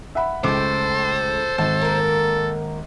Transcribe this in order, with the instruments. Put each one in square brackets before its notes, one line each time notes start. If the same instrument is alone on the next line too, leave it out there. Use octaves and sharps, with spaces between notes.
[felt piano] E5 F#5 B5
[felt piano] C#2 D6 [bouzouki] A3 G5 [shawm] A4 [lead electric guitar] C5
[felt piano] G#1 [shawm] A4 [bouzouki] A5
[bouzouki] A#3 A#4